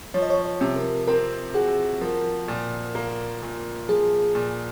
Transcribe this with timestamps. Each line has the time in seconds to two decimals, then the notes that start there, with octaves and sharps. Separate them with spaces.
0.14 F3 C#5
0.22 D#5
0.30 C#5
0.45 C#5
0.61 C3
0.76 A#4
1.07 C4 A#4
1.54 F#4 G#4
2.01 F3 A#4
2.48 A#2
2.95 A#3
3.42 A#2
3.88 F3 G#4
4.35 A#2